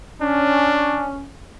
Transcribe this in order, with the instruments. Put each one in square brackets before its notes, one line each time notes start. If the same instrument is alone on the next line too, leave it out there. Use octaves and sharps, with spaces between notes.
[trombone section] C#4 [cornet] D4